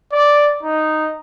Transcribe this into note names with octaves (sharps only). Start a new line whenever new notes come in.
D5
D#4